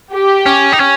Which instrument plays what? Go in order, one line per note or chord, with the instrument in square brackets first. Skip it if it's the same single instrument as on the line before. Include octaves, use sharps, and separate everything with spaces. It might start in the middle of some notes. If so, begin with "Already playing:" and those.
[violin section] G4
[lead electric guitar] C#4
D#4
C#4